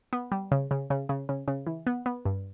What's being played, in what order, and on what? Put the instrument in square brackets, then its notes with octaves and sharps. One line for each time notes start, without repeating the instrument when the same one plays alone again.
[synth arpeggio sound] B3
G3
C#3
C#3
C#3
C#3
C#3
C#3
E3
B3
B3
G2